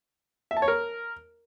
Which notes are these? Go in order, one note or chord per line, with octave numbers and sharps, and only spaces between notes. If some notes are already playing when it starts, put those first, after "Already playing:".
E5
A5
C#5
A#4